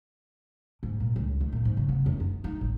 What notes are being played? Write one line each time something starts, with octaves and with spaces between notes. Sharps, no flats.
G#2
A#2
C#2
D#3
A#2
G#2
C#3
B3
F#2
B3
D#4
A1